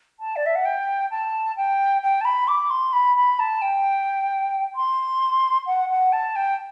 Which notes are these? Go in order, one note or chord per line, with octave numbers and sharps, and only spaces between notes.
A5
D5
E5
F#5
G5
A5
G5
G5
A5
B5
D6
C6
B5
B5
A5
G5
C6
F#5
F#5
A5
G5